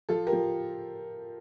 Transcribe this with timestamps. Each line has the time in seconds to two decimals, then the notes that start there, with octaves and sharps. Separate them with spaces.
0.09 F3 F4 A4
0.27 G4 A#4
0.32 F3